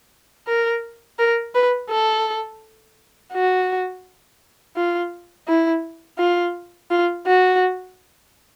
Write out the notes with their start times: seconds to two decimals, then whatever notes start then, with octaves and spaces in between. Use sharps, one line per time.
0.48 A#4
1.19 A#4
1.55 B4
1.91 A4
3.33 F#4
4.76 F4
5.48 E4
6.18 F4
6.91 F4
7.27 F#4